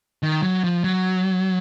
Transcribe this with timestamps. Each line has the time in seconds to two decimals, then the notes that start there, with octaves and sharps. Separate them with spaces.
0.23 D#3
0.43 F#3
0.64 F3
0.84 F#3